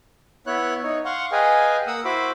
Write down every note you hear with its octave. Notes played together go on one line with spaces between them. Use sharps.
B3 E4 C#5 F#6
D#4 C#5
F5 F#5 C6 C#6
G#4 B4 D#5 F5 G5 G#5
A#3 F#5 D#6 E6
E4 F#4 C5 B5 D6